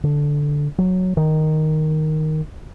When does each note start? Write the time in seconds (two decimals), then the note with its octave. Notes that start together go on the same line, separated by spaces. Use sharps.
0.04 D3
0.78 F#3
1.17 D#3